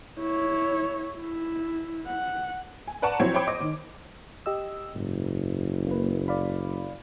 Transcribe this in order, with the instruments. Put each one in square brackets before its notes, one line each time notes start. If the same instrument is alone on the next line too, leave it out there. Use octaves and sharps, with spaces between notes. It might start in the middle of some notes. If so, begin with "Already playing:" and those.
[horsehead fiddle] E4 C#5
E4
F#5
[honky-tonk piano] G#5
B4 D5 F#5 A5 A#5 C#6
F3 F#3 C4 E4 C5 C#5
C5 C#5 G5 B5 D6
C5 D#5 D6
D#3
[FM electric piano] G4 D#5 E6
[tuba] F#1 [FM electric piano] G#2
[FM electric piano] A#3 B4
D5 F5 B5